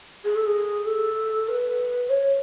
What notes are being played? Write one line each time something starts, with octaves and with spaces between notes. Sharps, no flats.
G#4
A4
G#4
A4
B4
C#5